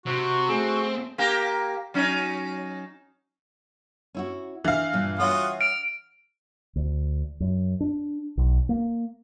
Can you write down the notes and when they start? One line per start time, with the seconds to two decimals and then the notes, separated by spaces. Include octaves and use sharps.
0.06 C3 F#4
0.49 A3 C4 G#4
1.18 A#3 G4 A#4
1.94 F#3 C#4 D#4
4.14 C#4 E4 F#4
4.64 E3 D4 F5
4.93 G2 A#2
5.20 F4 F#4 C#5 F#5 D#6
5.61 F6 D7
6.76 D2
7.40 F#2
7.80 D4
8.37 B1
8.69 A#3